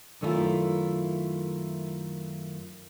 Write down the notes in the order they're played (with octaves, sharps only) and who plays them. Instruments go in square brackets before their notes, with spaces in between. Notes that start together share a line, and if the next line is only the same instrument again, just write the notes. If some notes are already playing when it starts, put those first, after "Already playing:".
[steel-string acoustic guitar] F#2 D#3 A3 D4 E4 F4